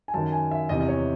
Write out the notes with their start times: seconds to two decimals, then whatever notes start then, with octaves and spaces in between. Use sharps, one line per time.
0.08 G#5
0.14 F#2 D#3 A5
0.32 G#5
0.51 E5
0.69 E2 C3 E3 D#5
0.81 D#5
0.89 C#5